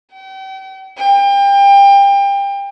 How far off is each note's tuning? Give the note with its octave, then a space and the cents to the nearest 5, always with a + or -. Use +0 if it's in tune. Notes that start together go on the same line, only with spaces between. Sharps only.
G5 -40
G5 +30